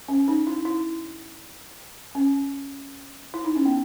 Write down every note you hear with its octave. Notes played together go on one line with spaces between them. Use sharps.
C#4
D#4
E4
E4
C#4
E4
D#4
C#4
B3